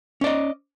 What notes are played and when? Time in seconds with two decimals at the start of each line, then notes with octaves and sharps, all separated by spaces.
0.21 C#4
0.24 D5
0.27 D#5